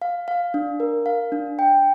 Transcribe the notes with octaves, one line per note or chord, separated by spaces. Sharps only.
F5
F5
D4
A#4
F5
D4
G5